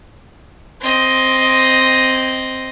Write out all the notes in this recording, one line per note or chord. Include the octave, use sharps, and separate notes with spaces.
C4 D#5